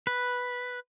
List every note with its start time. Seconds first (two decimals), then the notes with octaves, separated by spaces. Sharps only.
0.07 B4